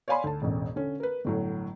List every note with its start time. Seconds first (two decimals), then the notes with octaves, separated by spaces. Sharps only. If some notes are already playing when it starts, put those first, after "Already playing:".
0.08 C#5 D5 F5 G#5 B5 C6
0.24 D2 A5
0.42 E1 A1
0.76 D3 C#4
1.00 A#4 B4
1.25 G1 A2 F#3